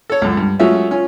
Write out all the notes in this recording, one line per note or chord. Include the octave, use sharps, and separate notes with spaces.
A4 C#5
C#2 F#2
G2
F#3 G#3 A3 C#4 F4 E5
C#4 F4